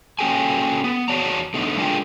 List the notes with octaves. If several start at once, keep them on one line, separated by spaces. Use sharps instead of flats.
A#3 C#4 F#4 A4 G5 G#5
B3
E2 F#4 C#5 D5 A5 A#5
D3 A3 B3 D#4
G#3 D4 F4 G#4 A#4 G5